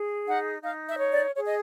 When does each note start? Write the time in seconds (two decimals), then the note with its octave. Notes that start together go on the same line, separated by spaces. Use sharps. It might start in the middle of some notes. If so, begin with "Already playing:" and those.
Already playing: G#4
0.26 D#4 F#5
0.63 D#4 F5
0.88 E5
0.99 C#5
1.11 D5
1.35 G#4 C#5
1.46 D#5